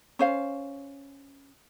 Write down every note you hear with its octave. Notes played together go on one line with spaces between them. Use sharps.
C#4 C5 F5